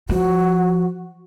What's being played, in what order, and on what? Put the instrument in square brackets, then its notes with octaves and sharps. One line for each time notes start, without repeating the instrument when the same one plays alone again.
[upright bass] F3 [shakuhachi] F#4